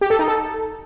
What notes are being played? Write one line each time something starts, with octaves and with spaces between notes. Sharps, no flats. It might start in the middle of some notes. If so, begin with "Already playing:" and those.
G4
A4
D#4
A4